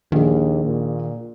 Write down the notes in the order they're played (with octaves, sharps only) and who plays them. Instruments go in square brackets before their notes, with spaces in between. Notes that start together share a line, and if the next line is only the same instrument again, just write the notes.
[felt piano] A#1 G#4 [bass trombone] D#2 [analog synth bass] D#3
[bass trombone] A#2